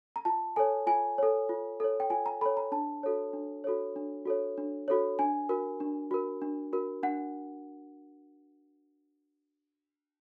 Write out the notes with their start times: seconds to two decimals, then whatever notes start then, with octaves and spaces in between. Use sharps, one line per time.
0.16 A#5
0.25 F4 A5
0.56 A4 C#5 G#5
0.87 F4 G#5
1.18 A4 C#5
1.49 F4
1.80 A4 C#5
2.00 G5
2.10 F4 G#5
2.26 A#5
2.41 A4 C#5 B5
2.57 A#5
2.72 D4 A5
3.03 F#4 A4 C#5
3.33 D4
3.64 F#4 A4 C#5
3.96 D4
4.26 F#4 A4 C#5
4.58 D4
4.88 F#4 A4 C#5
5.19 D4 G#5
5.49 F#4 A#4
5.80 D4
6.11 F#4 A#4
6.42 D4
6.73 F#4 A#4
7.03 D4 F#5